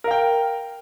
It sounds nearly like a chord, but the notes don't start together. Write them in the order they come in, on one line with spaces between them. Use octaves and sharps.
A#4 F5 G5